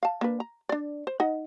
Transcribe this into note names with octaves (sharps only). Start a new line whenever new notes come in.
F5 A5
A#3 D4 B4
A#5
D4 D5
C5
D#4 D#5 F#5